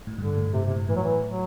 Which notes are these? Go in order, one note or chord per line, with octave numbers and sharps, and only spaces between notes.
A2
G2 D3
A2
A2 C3
C3
A2
A2 E3
F#3
E3
F#3